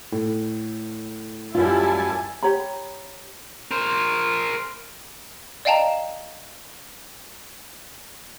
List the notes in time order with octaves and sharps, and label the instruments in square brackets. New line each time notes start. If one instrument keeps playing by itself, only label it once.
[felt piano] A2
[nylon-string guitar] F#2 F4 [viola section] G3 E4 [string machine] G#5 A5
[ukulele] G4 C#5 A#5 B5
[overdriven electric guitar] A#4 C5
[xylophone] D5 D#5 F5 G5 A5 A#5